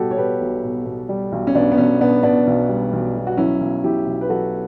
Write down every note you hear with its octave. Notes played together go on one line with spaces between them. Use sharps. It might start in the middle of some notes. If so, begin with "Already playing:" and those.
Already playing: B2 G3 F#4 G4 A4
C#5
B2 G4 B4
B1
B2
B2
G3
B1
C#4
B1 B3 D4
B3
B1 C#4
B2 B3 D4
B2 B3 D4
B1
G3
B1
B1
F#4
F#3 C#4 E4
B1
B1 E4 G4
B1
B4
F#3 F#4 A4